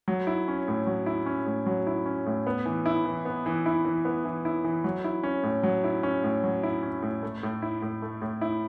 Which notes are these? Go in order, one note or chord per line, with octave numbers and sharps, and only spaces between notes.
F#3
E4
C#4
A2
F#3
E4
C#4
A2
F#3
E4
C#4
A2
B3
E3
E4
E3
B3
E3
E4
E3
B3
E3
E4
E3
F#3
E4
C#4
A2
F#3
E4
C#4
A2
F#3
E4
C#4
A2
A3
A2
E4
A2
A3
A2
E4